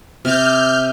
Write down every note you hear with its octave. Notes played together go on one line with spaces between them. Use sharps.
C3 F6 G6